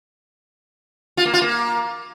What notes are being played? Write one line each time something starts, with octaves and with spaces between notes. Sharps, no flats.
F4
A#3
F4
A#3